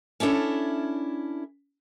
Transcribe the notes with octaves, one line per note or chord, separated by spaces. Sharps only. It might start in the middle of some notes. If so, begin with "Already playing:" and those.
C#4 D4 E4 A4 C#5